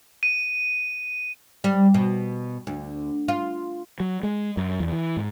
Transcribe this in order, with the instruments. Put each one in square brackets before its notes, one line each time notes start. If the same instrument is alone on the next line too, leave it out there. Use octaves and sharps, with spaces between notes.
[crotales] D#7
[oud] G3
B2
D2
F4
[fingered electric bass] F#3
G#3
F#2
E2
E3
G#2